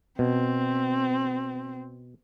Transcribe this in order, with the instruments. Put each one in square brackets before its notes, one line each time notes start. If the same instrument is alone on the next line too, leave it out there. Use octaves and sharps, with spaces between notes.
[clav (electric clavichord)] B2 [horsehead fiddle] C4